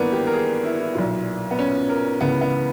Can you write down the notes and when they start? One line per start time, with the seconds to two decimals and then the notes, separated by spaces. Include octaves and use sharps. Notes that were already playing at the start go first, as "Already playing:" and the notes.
Already playing: G#1 G2 E3 A#3 B3
0.12 G4
0.27 A#4
0.33 G#4
0.65 E4
0.80 E4
0.95 B1 A#2
1.51 B3
1.59 C#4
1.90 A#4
2.21 C#2 C#3 E3 B3
2.41 B3